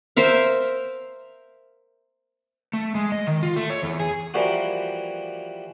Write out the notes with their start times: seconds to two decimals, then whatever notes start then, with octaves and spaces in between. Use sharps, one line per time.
0.16 A#4 C5 E5 F5
2.73 A3
2.95 G#3
3.12 D#5
3.27 D#3
3.43 F4
3.56 A3
3.70 C#5
3.83 E2
4.00 G#4
4.34 E3 F3 G3 A#3 E4 F#4